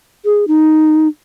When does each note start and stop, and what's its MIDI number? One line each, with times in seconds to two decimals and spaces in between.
0.25 0.45 68
0.47 1.08 63